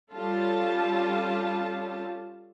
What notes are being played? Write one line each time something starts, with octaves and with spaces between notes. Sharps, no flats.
G3 C#4 F4 A4 A5